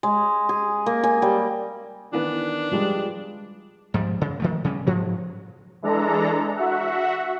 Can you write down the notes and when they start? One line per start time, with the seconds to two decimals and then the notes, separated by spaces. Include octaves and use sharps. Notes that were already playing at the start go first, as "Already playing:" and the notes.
0.03 G#3
0.49 G#4
0.86 A#3
1.03 G#5
1.22 G3
2.13 D#3 E3 B3 D4
2.72 F3 G3 G#3 F4
3.94 G#2 F3 G3
4.21 C#3
4.40 D#3 F3 A3
4.64 C#3 G3 C#4
4.87 G#2 F3 F#3
5.82 E3 G#3 D4 A4 A#5
6.56 F#4 E5 F#5